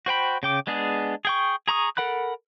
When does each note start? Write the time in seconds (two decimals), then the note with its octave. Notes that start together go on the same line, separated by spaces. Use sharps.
0.06 F#4 C5 G5 B5
0.43 C#3 G5 D6
0.67 G#3 B3 D4 G#4
1.25 G#4 G5 C#6
1.68 G#4 A#5 C#6 D#6
1.97 A4 A#4 F#5 B5 F#6